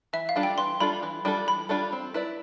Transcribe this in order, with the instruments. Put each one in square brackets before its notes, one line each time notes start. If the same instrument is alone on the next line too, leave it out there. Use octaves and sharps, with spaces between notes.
[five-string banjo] E3 [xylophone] E5
[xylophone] F5
[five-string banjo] G3 D4 F4 A4
[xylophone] G5
[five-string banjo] E3 [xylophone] C6
[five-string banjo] G3 D4 F4 A4 [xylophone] B5
[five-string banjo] E3
G3 D4 F4 A4
[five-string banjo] E3 [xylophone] B5
[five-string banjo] G3 D4 F4 A4
C4
E4 B4 D5